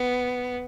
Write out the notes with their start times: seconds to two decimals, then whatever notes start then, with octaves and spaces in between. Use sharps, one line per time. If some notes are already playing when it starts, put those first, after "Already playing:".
Already playing: B3